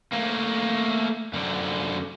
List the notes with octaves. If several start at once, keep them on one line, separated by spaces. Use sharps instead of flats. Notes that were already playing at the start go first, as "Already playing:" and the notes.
A3 A#3
F#2 D3